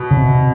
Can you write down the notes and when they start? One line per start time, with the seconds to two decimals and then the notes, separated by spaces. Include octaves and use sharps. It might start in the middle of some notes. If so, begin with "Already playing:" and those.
Already playing: B2
0.11 C#3
0.17 C3